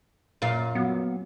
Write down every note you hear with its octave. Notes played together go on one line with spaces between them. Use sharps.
F#2 A#2 F5
F#3 B3